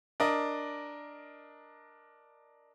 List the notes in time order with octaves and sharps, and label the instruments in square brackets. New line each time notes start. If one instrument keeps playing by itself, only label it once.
[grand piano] D4 A#4 D#5